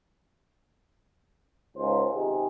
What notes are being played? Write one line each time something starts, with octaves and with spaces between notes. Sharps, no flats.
C#2 G#2 C5
C3 D#3 G#4